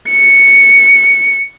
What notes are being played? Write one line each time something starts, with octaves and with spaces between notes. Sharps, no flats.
C#7